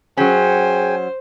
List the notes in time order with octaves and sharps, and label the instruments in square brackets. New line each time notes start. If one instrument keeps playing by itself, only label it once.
[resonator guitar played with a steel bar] F#3 C#4 [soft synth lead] G#4 [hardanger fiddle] C5 [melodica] G5 G#5